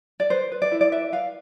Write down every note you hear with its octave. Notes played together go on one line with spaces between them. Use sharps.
D5
B4 C5
B4
D5
E4
D5
B4 E5
B4 F5